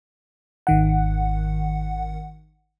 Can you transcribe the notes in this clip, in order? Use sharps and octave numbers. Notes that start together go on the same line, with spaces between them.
G#1 D#3 F#5